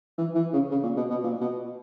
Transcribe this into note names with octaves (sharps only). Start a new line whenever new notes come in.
E3
E3
C#3
C#3
A#2
B2
B2
A#2
B2